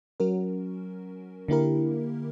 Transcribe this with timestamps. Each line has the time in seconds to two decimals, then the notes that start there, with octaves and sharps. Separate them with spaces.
0.20 F#3 C#4 F#4 A#4
1.48 D3 A#3 E4 G4 A#4